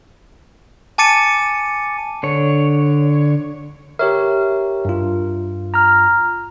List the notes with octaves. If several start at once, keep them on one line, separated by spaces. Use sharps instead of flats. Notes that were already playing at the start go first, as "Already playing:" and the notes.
G#5 A5 D6 A6 C#7 D#7
D3 C#5
G4 A#4 C#5 E5
G2 F4
A#5 F6